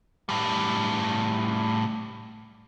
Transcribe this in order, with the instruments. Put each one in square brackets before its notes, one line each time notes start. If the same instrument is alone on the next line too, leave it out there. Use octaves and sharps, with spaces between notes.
[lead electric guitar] A2 G3